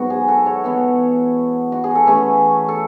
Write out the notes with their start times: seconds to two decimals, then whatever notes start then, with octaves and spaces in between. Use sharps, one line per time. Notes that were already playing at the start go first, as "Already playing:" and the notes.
Already playing: G#2 F#3 B3 F#4
0.10 G#4
0.28 F#4 A4
0.46 A4 C#5
0.64 E3 B3 E4
1.72 F#4
1.84 G#4
1.95 A4
2.06 E3 A3 C#4 G#4 B4
2.69 A4